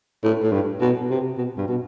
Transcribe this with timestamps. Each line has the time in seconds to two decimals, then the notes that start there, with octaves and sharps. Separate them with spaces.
0.24 A2
0.43 A2
0.52 G2
0.81 B2
1.10 C3
1.38 B2
1.58 G2
1.68 B2